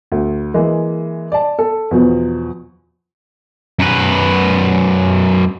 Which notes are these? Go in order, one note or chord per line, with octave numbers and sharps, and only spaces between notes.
D2
E3 G#3 A#3
D5 A5
A4
E2 B2 F3
F#2 B4